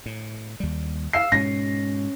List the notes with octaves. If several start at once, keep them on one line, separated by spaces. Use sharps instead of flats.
A2
D#2 G3
F5 E6 C7
G#2 B2 G#3 C#4 A#6